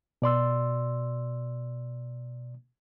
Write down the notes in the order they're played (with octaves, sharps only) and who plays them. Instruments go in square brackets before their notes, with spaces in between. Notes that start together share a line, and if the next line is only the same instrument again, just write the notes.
[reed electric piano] B2 D5 C6 E6